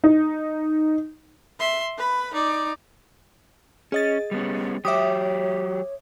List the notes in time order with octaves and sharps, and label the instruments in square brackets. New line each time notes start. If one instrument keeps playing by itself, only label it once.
[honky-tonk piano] D#4
[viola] E5 C6
B4 B5
D#4 D5
[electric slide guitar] C#4 [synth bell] G#4 D#5 A6
[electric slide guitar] G3 B3 C#4
[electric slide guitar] F#3 G4 [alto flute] C#5 [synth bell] E5 D6 D#6